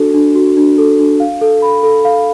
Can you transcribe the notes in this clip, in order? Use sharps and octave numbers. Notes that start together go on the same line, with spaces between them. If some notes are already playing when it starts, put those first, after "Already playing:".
Already playing: D4 F#4 A4
D4
F#4
D4
A4
D4
F5
A4
B5
A4
F5